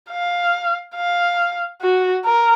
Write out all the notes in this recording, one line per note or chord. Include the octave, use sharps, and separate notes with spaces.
F5
F5
F#4
A#4